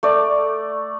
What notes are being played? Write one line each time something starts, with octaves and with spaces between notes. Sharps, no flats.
A3 D5